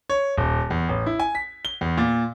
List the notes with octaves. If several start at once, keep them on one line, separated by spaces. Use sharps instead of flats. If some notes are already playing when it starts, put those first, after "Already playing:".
C#5
D#1
E2
A1
E4
G#5
B6
G7
E2
A#2